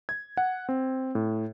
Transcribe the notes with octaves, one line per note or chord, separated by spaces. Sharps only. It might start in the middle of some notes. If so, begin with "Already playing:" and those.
G#6
F#5
C4
A2